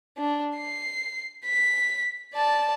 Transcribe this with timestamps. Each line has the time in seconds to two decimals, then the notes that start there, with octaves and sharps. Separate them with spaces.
0.17 D4
0.57 C7
1.45 B6
2.34 D5 A5